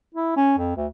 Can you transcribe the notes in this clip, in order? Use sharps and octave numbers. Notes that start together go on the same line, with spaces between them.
E4
C#4
F2
D2